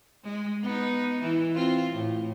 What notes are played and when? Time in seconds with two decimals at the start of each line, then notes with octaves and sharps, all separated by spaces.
0.24 G#3
0.63 B3 D#4
1.21 E3
1.54 C4 F4
1.93 A2